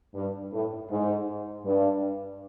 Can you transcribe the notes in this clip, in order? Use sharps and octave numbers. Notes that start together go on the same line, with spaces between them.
G2
A2
G#2
G2